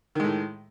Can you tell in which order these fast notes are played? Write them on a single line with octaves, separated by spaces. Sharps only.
D#3 G#3 A2